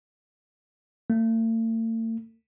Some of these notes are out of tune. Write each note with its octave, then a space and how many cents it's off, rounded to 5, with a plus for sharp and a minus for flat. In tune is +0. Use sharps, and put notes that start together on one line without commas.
A3 +45